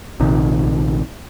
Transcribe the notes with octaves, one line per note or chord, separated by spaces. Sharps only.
A#1 C3 D#3